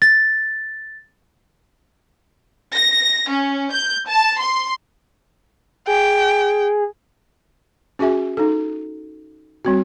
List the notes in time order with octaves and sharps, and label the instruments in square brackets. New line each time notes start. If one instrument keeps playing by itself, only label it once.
[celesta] A6
[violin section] A#6
C#4
G6
A5
C6
[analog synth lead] G#4 [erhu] G5
[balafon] C#4 F#4 G#4 E5 G#5
D#4 A4
G3 C4 F#4